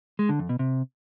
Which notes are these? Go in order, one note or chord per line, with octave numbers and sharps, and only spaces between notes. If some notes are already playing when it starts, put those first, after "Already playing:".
G#3
D3
F2
B2
C3